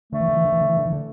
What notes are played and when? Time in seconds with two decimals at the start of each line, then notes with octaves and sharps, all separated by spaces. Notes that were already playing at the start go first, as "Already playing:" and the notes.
0.12 D3 A3
0.20 E3
0.28 D3
0.36 E3
0.45 D3
0.52 E3
0.61 D3
0.69 E3
0.77 D3
0.86 E3
0.93 D3